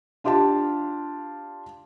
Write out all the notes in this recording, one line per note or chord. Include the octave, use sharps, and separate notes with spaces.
D4 F4 G4 F5 A5